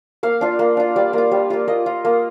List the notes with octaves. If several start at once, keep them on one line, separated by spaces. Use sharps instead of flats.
A#3 F5
D4 F4
A#3
D4 F4
G3 D5
A#3 F4
G3
A#3 F4
A#3 D#5
F4
A#3